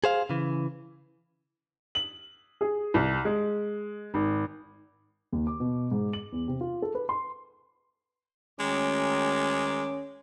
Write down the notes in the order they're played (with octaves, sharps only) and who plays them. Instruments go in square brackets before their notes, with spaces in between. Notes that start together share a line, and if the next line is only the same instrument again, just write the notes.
[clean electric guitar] G#4 C5 F5
C#3 E3
[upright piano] F#7
G#4
C2
G#3
G#1
[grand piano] D#2
D6
B2
G#2
F#7
E2
C3
F4
A4
B4
C6
[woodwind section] D2 D#3 D6 [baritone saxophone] G#3 [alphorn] C#4